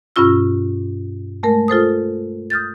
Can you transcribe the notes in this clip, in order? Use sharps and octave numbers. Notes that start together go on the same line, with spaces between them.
G2 B2 C#4 F4 E6
G#3 A3 A#4
F4 A4 C5 D#6
D#6 F6 G6 A6